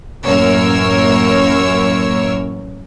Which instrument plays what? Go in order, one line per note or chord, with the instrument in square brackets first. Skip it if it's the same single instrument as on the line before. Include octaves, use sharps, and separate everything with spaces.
[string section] A1 F#2 A#3 A#4 C#5 E6